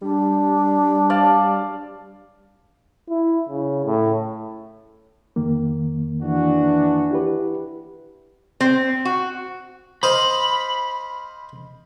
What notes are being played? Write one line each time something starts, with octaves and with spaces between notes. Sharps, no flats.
G3 D4
D5 F5 A5
E4
C#3
A2
F2 D#3 A#3
E3 D4 F#4
E4 G4 B4
C4
F#4
C5 D#5 F5 B5